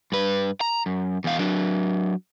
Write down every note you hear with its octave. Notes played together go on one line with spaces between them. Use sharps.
G2 B4
A#5
F#2
E2 F5
F#3 D4